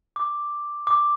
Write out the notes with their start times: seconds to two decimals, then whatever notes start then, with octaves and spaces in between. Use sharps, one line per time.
0.16 D6
0.87 D6